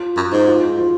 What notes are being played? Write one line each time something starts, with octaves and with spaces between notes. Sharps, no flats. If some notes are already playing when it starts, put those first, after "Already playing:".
Already playing: F4
F#2
G#2
F4
F4